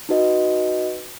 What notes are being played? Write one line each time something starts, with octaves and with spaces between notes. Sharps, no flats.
D#4 F#4 B4 D#5